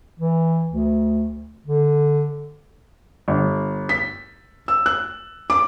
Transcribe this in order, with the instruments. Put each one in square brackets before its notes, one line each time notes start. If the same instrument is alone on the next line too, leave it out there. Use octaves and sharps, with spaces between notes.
[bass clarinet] E3
D2
D3
[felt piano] G1
B6
E6
F#6
D6